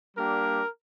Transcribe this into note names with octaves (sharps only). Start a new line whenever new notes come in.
G3 A#3 D4 G4 A#4